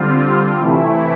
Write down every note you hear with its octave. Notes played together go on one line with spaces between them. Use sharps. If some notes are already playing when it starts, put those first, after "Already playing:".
Already playing: D3 G3 C4 F4
C3 E3 A3 E4